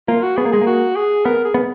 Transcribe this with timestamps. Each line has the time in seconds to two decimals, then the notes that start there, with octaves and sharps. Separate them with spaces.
0.08 A#3 F4
0.23 F#4
0.37 B3 G#4
0.45 A#3
0.52 G#3 G#4
0.61 A#3
0.67 F#4
0.96 G#4
1.25 B3 A#4
1.45 G#4
1.54 B3